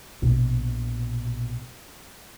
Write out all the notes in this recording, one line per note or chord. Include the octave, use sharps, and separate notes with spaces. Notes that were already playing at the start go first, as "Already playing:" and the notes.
A#1 B2